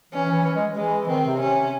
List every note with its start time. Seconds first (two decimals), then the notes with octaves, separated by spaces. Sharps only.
0.13 E3 C#4
0.29 E3
0.44 E3
0.55 G#3
0.76 E3 G#3
1.08 D#3 C4
1.25 C3
1.40 C3 C#4